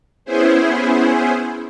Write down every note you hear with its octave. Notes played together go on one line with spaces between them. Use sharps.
B3 C#4 E4 G#4 C5